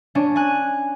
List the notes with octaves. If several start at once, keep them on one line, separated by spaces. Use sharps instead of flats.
C#4 D4
G#5 F#6